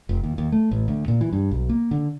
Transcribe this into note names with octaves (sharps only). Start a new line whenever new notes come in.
F1
D#2
D#2
A3
A1
D2
A#2
E3
G2
B1
A#3
D3